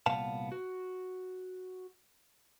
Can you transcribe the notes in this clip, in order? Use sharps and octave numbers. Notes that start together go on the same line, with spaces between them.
C2 A#2 B3 F5 A5
F#4